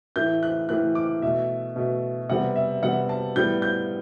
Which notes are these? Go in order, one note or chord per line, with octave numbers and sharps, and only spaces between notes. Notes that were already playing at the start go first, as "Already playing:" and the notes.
A2 E3 A3 G6
F#6
A2 E3 A3 F#6
D6
B2 A3 E5
B2 A3
C3 G3 B3 F#5
E5
C3 G3 B3 F#5
A5
A2 G3 B3 G6
G6